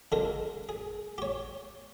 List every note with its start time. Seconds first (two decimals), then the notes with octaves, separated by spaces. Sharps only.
0.12 C#2 G#3 A4 A#4
0.69 G#4
1.18 G4 C#5